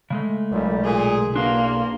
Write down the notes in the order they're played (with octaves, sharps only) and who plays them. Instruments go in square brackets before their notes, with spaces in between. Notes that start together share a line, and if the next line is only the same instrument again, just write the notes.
[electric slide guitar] C#3 G#3 A3
[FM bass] B1 [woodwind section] F#2 A#2 G3
[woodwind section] A#2 [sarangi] G#4
[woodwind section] E2 C6 [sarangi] A#3 [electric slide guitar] D4 F#4